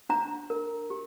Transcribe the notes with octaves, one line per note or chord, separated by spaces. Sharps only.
D4 A#5
A#4
G4